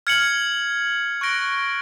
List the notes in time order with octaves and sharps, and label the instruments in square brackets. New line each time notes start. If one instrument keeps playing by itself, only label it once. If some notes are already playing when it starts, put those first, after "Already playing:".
[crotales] F6 G#6 C#7 F#7
C#6 F#6 A#6 D7 G7